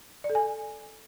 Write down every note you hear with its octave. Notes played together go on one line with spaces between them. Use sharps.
D5
A4
G#5